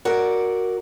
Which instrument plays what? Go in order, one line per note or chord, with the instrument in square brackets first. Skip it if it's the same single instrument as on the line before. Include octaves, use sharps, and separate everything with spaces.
[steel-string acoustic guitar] F#4 A#4 D5